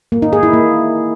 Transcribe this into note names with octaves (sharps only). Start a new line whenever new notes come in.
A#3
D#4
G#4
E4
A#3